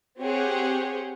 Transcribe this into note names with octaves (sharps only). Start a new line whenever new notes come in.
C4 G4 G#4 C#5 F#5 G5